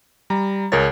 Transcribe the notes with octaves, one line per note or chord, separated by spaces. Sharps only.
G3 A#5
C#2 G#4 A#4 C#5 A6